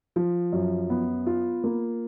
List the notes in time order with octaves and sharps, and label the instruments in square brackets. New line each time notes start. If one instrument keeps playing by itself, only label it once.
[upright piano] F3
F#2
B3
F4
A#3